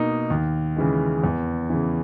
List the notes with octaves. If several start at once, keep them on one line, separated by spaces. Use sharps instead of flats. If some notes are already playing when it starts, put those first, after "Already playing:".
Already playing: B2 A#3 D#4
D#2
C#3 E3 G#3
E2
C#3 E3